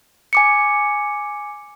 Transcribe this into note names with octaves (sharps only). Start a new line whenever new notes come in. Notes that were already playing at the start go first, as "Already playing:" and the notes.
G#5 D6 C#7